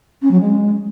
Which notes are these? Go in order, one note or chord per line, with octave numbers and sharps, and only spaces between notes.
C#4
F#3
G#3